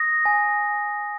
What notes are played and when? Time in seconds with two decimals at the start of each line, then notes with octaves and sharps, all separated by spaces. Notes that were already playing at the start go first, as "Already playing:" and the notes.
Already playing: D#6 A#6
0.25 G#5